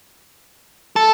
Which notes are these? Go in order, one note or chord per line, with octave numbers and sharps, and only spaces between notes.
A4